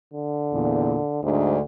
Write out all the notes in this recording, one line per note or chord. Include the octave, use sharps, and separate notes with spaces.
D3
E2 A#2
D2 G#2 D3